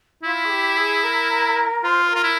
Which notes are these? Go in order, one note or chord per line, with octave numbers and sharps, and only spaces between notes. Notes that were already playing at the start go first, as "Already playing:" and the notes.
E4 F4
G#4
G4
G#4
A#4
F4 C5
C5
F4 A#4
E4